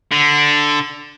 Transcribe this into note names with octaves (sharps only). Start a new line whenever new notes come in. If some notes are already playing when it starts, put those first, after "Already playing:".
D3